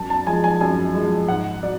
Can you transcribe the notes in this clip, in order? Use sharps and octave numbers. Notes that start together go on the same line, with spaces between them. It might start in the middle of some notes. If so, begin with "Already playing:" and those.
Already playing: F#2 A5
A5
F3 G#3 G#5
G#5
F#2 G#5
F3 G#3
G#2 F#5
F#3 D5